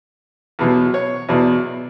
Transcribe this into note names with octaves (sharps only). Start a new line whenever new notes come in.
E2 B2 F#3
C#5
E2 B2 F#3 D5